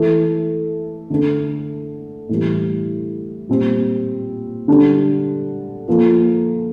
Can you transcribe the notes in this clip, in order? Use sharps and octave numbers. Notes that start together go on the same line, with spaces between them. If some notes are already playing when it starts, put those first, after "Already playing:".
Already playing: E3 A3 E4 A4
D3 A3 D4 A4
A2 E3 G3
A#2 G3 C4
D3 G3 D4 A4
F3 A#3 F4 A4